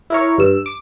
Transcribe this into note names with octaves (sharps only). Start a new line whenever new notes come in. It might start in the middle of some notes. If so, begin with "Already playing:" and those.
E4 A#4 C#5
G2 E6
D6